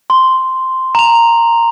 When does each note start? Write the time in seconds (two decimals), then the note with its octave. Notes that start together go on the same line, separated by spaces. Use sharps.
0.10 C6
0.95 A#5 F7